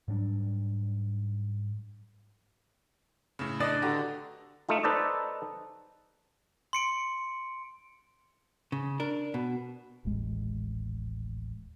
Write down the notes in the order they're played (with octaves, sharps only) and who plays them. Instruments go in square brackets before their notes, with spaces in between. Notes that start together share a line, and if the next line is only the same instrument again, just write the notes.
[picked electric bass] G#2 F#3 G3 D4
[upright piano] A2 C#3
[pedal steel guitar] D4 B4 D#6 [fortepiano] D5 D#5
[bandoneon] D3 [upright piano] F#4 G4 A#5
[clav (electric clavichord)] A3 D#4 F4
D#4 A4 B4 C5 D5 D#5
[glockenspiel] C6 C#7 D7
[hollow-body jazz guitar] C#3
D4 A#4
B2
[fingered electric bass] D#1 A1 G#3